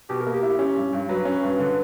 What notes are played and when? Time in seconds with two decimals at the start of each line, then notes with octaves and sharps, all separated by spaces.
0.09 B2 G4
0.21 A#4
0.27 A#3
0.34 G4
0.43 E4
0.59 C#4 G4
0.77 G2
0.93 G2
1.09 F#3 B4
1.25 C#4
1.43 G2
1.59 D3